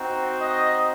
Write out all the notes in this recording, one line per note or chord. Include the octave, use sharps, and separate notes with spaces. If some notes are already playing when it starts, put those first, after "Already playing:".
Already playing: C4 D#4 F#4
D#5